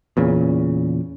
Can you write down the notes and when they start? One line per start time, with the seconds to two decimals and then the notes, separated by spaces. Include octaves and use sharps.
0.17 E2 A#2 C#3